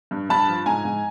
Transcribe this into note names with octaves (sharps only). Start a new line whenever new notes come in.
G2
G2 A5 B5
F3
G#2 G#5 A#5
G#2